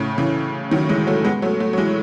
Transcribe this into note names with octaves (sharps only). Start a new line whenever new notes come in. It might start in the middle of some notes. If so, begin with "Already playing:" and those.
Already playing: A2 C#3
C#3 E3
D#3 F#3
E3 G#3
F#3 A3
G#3 B3
F#3 A3
F#3 A3
F#3
E3 G#3